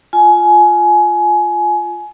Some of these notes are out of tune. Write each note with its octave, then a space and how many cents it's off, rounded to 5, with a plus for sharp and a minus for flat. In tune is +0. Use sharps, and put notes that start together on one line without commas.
F4 +0 G#5 +20